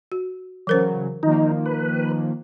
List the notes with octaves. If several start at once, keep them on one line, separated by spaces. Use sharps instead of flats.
F#4
C#3 E3 F#3 A#4 C5
D#3 F3 A#3 D#4
B4